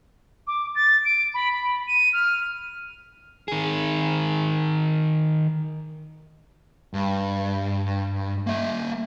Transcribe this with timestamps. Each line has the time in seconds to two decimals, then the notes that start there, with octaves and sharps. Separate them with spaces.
0.47 D6
0.75 A6
1.04 D7
1.34 B5
1.52 B5
1.87 D#7
2.13 F6
3.48 D#3 G#4
6.94 G2
8.47 A#3 E5